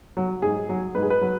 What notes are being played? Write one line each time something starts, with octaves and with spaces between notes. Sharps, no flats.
F#3
G#2 G#4
F#3
G#2 B4
G#4
B4
F#3